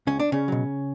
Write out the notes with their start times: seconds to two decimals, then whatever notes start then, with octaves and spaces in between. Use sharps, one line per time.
0.07 C#2 C#4
0.20 D4
0.32 C#3 C#4
0.48 B2 F#3